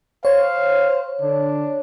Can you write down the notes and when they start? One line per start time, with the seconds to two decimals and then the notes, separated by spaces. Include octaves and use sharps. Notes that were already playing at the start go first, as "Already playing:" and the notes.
0.25 C5 C#5 F5
1.22 D3 D4